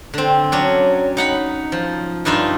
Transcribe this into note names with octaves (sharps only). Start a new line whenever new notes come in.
D3 C4
F#3 C#4 D4
D#4 F#5 B5
F3
G2 D4 D#4 F4 E5